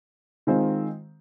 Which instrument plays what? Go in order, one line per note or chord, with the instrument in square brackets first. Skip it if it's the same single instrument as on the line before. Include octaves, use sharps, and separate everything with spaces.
[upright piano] D#3 G#3 C4 F4 C5